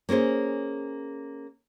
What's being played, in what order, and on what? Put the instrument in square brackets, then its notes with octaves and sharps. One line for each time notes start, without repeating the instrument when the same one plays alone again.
[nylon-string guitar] A#3 C#4 G#4 C5